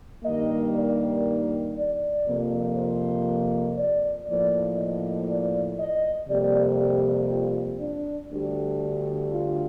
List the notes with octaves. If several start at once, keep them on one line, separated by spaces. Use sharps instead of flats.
G2 D#3 G3 A#3 D#5
D5
D5
F2 C3 F3 A#3
C5
D5
A2 F3 A#3 D5
D#5
D5
D#5
F2 C3 G3 A#3 D5
G4
F4
D4
D2 D3 G3
F4